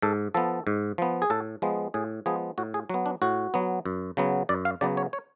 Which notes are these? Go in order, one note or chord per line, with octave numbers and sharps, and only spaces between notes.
G#2 A4
F3 B3 A4
G#2
F3 B3
G#4
A2 A4
F3 G#3 B3
A2 G#4
F3 G#3 B3 G#4
A2 F#4
G#4
F#3 B3 F#4
D4
A2 F#4
F#3 B3
F#2
C#3 F#3 B3
F#2 D5
F5
C#3 F#3 B3 D5
C#5
C#5